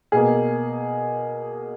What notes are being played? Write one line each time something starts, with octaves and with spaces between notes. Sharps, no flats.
B2 A#3 G#4